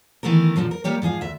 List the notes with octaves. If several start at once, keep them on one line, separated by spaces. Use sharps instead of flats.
D#3 E3 A3 B3 A#4
A#2 D3 D#3 F3 F#3
A#4
G3 A#3 G4 C#5
G#2 F3 G#4 F5
D2 E5